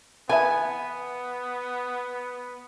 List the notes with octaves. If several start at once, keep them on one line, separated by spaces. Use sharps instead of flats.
E3 B3 B4 E5 G#5